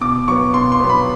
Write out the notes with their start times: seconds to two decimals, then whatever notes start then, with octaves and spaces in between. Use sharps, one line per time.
0.01 B2 D6
0.28 F#3 B3 C#6
0.54 B2 C6
0.72 C6
0.80 F#3 B3
0.89 B5